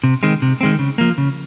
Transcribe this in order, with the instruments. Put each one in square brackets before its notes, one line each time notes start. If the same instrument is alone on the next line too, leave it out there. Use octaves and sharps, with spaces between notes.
[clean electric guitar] C3
D#3 G#3 C4
C3
D#3 G#3 C4
C#3
F3 A#3
C#3